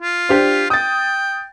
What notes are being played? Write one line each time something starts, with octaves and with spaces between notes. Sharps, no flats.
F4
D4 G4 C5
G5 D#6 A6